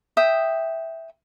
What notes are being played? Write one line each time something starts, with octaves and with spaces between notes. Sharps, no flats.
E5 G5 D#6